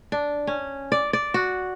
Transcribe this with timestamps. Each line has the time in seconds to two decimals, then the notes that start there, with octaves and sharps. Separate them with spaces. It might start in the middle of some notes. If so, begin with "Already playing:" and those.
0.12 D4
0.47 C#4
0.92 D5
1.13 D5
1.34 F#4